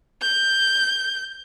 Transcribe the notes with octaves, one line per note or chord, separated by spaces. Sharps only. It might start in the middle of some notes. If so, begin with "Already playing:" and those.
G6